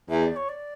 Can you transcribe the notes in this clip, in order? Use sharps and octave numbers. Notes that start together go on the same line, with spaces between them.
E2 E5
D5
C#5
D5